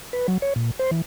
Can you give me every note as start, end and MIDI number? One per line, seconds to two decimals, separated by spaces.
0.13 0.27 71
0.28 0.38 54
0.42 0.53 73
0.56 0.71 46
0.79 0.91 72
0.91 1.02 52